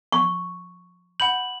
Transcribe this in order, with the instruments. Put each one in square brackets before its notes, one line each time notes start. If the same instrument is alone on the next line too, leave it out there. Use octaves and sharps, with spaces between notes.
[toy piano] C#6
[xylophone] F#5 B5 G6 [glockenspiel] F#7